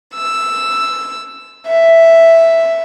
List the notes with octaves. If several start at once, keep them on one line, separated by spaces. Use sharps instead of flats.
E6
E5